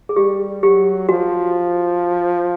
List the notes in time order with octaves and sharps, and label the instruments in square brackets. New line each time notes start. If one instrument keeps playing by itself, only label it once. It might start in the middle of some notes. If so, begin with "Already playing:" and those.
[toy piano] G#4
[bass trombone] G3 [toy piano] G4
[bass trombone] F#3 [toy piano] G4
[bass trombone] F3 [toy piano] F#4